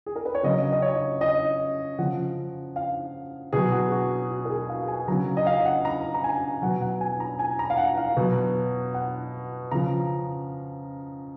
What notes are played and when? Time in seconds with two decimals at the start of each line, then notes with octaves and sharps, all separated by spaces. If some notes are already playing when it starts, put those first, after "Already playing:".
0.06 G#4
0.16 A#4
0.25 B4
0.35 C#5
0.43 C#3 F#3 D#5
0.72 D#5
0.82 C#5
1.21 D#5
1.99 C#3 F3 F#5
2.76 F5
3.53 B2 F#3 G#4
3.72 F#4
3.92 F#4
4.31 F#4
4.45 A#4
4.50 G#4
4.69 F5
4.88 G#5
5.08 C#3 F#3 A#5
5.37 D#5
5.46 F5
5.65 F#5
5.85 A#5
6.14 A#5
6.24 G#5
6.62 B2 F#3 F#5
6.82 F#5
7.01 G#5
7.20 A#5
7.39 G#5
7.59 A#5
7.70 F5
7.78 F#5
7.97 F5
8.17 B2 F#3
8.94 F#5
9.71 C#3 F3 A#5